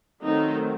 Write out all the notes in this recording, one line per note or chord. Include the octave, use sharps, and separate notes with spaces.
D#3 F#3 A3 C4 D#4